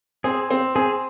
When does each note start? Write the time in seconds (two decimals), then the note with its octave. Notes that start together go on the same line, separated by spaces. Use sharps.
0.24 C4 G#4
0.51 C4
0.76 C4 G#4